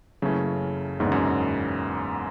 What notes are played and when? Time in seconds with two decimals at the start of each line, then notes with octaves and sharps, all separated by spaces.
0.22 F#1 F#2 C#3 E3 A3 C#4
1.00 F#1 E2 G#2 D3
1.12 F#2